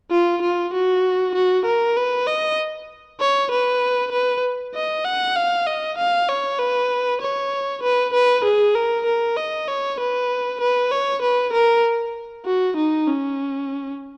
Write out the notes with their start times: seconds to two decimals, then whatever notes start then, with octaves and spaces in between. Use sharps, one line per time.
0.11 F4
0.42 F4
0.74 F#4
1.35 F#4
1.66 A#4
1.97 B4
2.27 D#5
3.21 C#5
3.51 B4
4.13 B4
4.75 D#5
5.05 F#5
5.36 F5
5.67 D#5
5.98 F5
6.29 C#5
6.60 B4
7.22 C#5
7.83 B4
8.14 B4
8.45 G#4
8.76 A#4
9.06 A#4
9.37 D#5
9.68 C#5
10.00 B4
10.61 B4
10.92 C#5
11.23 B4
11.53 A#4
12.46 F#4
12.77 D#4
13.08 C#4